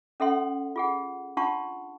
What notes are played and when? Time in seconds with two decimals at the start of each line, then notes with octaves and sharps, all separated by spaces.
0.20 C#4 A4 E5 F#5 C6
0.76 F4 G#4 F#5
1.37 D4 F4 F#5 A5 C6 C#6